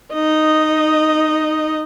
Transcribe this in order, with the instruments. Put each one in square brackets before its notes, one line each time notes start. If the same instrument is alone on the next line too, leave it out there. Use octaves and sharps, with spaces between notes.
[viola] D#4 D#5